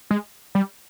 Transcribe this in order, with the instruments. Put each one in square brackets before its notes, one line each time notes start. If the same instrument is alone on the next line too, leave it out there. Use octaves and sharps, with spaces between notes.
[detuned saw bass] G#3
G3